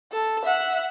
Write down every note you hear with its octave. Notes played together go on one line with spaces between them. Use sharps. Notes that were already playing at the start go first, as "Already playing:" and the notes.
A4
E5 F#5